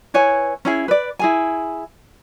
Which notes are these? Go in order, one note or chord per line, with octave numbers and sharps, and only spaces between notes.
E4 B4 C#5 G#5
C#4 E4 G#4
B4 D5
E4 G#4 G#5